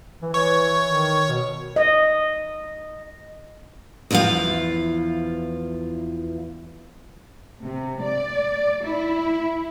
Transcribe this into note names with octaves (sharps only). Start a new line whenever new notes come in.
E3
E3 C#5
D#3
B2
D#5
E2 F3 E4 F4 F5
C3
D5
E4